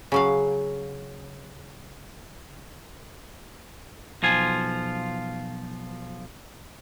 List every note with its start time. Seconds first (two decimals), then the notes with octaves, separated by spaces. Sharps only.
0.12 C#3 F#3 F5
4.23 B1 F3 F4 G#5